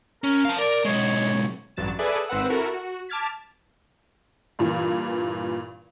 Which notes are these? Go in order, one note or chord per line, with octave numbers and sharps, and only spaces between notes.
C#4 A#4
F5 A5
A#4 D5
B1 G#3 C#5
A1 G2 F#3 A6 E7
G#4 A4 B4 D5 E5 G#5
G#1 C4 B4 F#5 E6
E4 F#4 A4 A#4
F#4
A5 D6 F6 G#6 A6 B6
G2 A#2 E3